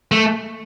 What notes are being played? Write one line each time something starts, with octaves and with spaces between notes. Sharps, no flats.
A3